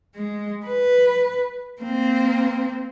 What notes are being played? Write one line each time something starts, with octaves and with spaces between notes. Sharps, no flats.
G#3
B4
A#3 C4